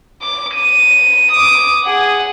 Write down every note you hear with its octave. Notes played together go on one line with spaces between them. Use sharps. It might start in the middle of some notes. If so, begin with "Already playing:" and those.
D6
D#7
D6 D#6
G#4 F#5